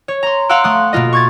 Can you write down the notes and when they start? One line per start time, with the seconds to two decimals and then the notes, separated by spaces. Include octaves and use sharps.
0.08 C#5
0.23 A#5 C6
0.49 F5 F#5 C6 E6 F#6 D7
0.64 A3 C6 D#6 F#6
0.93 B2 A#3 F4 D#5
1.13 C#6 G#6 A6